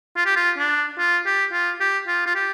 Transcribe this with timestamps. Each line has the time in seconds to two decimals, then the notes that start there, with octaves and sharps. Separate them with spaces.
0.16 F4
0.26 G4
0.36 F4
0.58 D4
0.98 F4
1.26 G4
1.52 F4
1.80 G4
2.07 F4
2.26 F4
2.35 G4